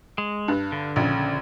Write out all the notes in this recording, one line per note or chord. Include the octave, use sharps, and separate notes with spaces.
G#3
G2
D3
A#1 C#3